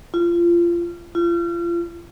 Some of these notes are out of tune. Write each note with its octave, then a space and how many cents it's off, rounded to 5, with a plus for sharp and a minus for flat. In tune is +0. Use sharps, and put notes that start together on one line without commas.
F4 -25
F4 -35